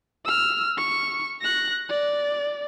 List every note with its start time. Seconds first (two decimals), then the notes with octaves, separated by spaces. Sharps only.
0.25 E6 F6
0.77 C#6
1.41 F#6 A#6
1.89 D5